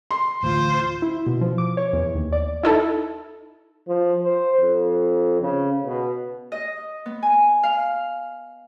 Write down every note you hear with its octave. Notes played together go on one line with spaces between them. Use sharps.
C6
A1 D2 F4 C5
E4
B2
F3
D6
C#5
E2
D#2
D5
D#4 E4 A4
F3
C5
F2
C#3
B2
D#5
B3
G#5
F5